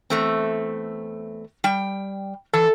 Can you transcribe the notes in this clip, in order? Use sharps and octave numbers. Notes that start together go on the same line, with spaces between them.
E2 A3 C4
G3 G5
E3 A4